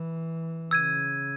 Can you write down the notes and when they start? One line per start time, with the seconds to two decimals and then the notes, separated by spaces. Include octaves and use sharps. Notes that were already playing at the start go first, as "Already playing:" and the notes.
Already playing: E3
0.71 C#3 E6 G#6 D#7